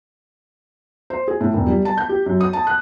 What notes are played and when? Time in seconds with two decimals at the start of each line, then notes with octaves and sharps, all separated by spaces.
1.10 C5
1.28 G#4
1.41 A2
1.53 E1
1.67 G3
1.85 A5
1.98 G6
2.09 G4
2.26 F#2
2.41 D#6
2.53 A5
2.67 F#6